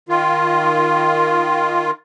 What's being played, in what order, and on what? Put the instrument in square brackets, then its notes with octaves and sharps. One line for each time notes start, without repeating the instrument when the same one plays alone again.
[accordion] D#3 F4